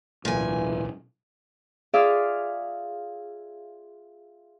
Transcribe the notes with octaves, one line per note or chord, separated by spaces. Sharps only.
D1 B1 A#2 E3 G#5
F4 G#4 D5 E5 F5